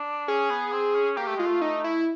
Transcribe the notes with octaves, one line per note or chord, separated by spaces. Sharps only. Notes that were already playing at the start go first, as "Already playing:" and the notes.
Already playing: D4
C#4 G#4
B3
C4
C#4
A#3 G4
A3
G#3 F4
A3
D#4
E4